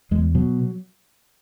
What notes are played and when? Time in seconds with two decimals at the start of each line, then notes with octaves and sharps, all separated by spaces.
0.11 E2 G#3
0.35 B2 F#3